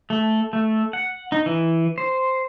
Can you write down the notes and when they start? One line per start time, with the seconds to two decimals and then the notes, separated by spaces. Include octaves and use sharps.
0.10 A3
0.53 A3
0.93 F#5
1.32 D#4
1.46 E3
1.98 C5